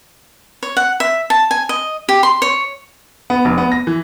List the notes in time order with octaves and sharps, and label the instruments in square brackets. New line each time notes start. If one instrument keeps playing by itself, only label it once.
[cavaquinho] C#5
F#5
E5
A5
G#5
D#5
G4
C6
C#5
[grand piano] B3
F1
B3
A#6
E3